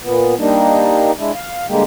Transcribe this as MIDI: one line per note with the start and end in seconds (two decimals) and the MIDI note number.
0.01 0.35 46
0.01 0.35 59
0.39 1.11 55
0.39 1.11 58
0.39 1.11 62
0.39 1.11 63
1.18 1.32 56
1.18 1.32 62
1.18 1.32 64
1.35 1.66 77
1.68 1.83 50
1.68 1.83 55
1.68 1.83 56
1.68 1.83 58
1.68 1.83 67